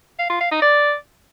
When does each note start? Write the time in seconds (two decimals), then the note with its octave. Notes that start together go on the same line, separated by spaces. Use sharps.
0.19 F5
0.30 F4
0.40 F5
0.51 D#4
0.62 D5